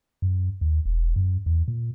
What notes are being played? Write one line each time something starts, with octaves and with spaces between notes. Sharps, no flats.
F#2
D#2
E1
F#2
E2
A#2